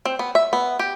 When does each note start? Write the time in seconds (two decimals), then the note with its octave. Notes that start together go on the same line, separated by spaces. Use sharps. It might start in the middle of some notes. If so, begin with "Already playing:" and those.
0.05 C4
0.19 B3
0.35 E5
0.53 B3
0.79 G4